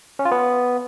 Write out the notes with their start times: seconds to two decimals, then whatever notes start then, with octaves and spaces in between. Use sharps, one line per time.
0.19 C#4
0.25 F4
0.31 B3